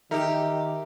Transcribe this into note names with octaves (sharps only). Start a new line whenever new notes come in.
D#3 D#4 G4 A#4 E5